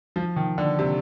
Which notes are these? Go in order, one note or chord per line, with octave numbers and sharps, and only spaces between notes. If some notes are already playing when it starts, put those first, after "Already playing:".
F3
D#3
D3
C3